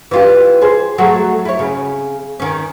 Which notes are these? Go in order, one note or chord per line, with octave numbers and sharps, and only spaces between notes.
E3 F4 G4
G#4 C5
F#3 A3 G#4
E4 C#5
C#3
D#3 C#4